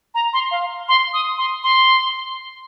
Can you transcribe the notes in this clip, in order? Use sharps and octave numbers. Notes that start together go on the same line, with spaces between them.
A#5
C6
F5
C6
D#6
C6
C6